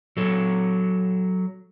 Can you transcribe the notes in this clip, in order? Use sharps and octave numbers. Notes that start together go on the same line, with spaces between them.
F#3 A4 C#5